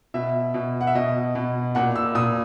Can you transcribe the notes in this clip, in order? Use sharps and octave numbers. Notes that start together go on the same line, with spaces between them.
B2 E5
B2
F#5
E5
B2 D#5
B2
A#2 F#5
E6
A#2 D#6